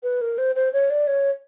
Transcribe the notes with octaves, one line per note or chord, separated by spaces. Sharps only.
B4
A#4
C5
C5
C#5
D5
C#5